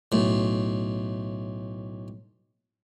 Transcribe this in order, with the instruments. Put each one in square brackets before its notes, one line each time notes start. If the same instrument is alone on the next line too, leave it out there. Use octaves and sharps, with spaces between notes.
[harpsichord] B1 A2